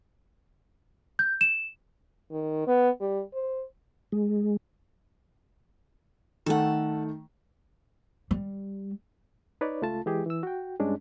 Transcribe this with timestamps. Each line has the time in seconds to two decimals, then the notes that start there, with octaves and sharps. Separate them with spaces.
1.19 G6
1.41 E7
2.32 D#3
2.67 B3
3.01 G3
3.34 C5
4.12 G#3
6.46 D#3 A3 A4 F#5
8.31 G3
9.61 D#4 B4 C#5 D5
9.82 C#2 A3 F4 A5
10.06 E3 G#3 G4 G#4
10.26 E3 E6
10.43 F#4 G5
10.80 G2 G#3 C#4 D4